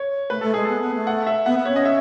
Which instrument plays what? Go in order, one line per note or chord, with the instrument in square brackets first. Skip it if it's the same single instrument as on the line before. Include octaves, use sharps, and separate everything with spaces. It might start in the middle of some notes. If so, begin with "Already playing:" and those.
Already playing: [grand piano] C#5
[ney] A3 [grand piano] B4
[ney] A3 [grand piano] A4
[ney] G#3 [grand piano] G#4
[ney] B3 [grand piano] A4
[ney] B3
A3
[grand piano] F#5
E5
[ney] B3 [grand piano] F#5
[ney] B3
[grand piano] C#5
[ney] C#4 [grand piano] D#5
[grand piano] E5